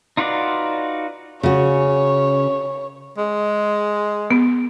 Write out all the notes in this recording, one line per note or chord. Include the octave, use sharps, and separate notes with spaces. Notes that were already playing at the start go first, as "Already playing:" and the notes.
D#4 F4 F#4 B4 D5
C#3 F#4 C#5
G#3
B3